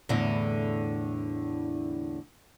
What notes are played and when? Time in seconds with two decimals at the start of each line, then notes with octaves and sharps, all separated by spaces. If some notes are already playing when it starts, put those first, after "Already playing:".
0.09 E2 A2 D3